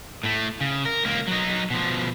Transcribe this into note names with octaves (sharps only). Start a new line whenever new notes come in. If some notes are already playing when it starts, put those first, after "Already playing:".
A2 A3
C#3
A#4
C#2 A#3
F#3 D#4
B2 F3